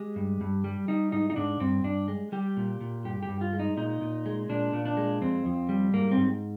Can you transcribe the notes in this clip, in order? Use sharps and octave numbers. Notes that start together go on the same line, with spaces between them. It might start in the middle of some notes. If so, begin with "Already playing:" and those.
Already playing: G#3 G4
G2
G2
G3
G3 D#4
G#2 D#4
D#4
G#2 D4
G2 C4
G2 D4
G#3
G3 G4
A#2
A#2
G2 G4
G4
G2
F4
G#3
D#4
A#2 D#4
A#2
G#3
A#2 D4
A#2
D4
G#3
F2 C4
F2
G3
G#2 A#3
C4
G#2